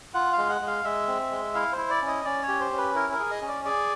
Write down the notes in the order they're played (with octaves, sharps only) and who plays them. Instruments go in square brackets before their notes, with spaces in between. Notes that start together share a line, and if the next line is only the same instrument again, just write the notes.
[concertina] F4 F#5
F5
G#3
F#5
G#3
F5
G#3 E5
C4
G#3
E4 F5
C5
E4
D5
C#4
D#5
C#4 D5
C#5
G4
C5
C#4
B4
E4 A#4
A#4
G#4
D#5
C#4
D5
G#4 D5